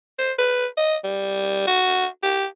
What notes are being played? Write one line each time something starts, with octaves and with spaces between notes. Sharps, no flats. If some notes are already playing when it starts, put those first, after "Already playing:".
C5
B4
D#5
G3
F#4
G4